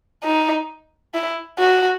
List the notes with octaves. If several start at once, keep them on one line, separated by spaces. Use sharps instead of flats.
D#4
E4
F#4